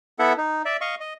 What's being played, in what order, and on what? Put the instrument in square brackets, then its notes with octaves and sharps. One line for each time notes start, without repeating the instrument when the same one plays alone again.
[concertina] B3 E4 A4 E5 F#5
D#4
D5 E5
D#5 F5 C#6
D#5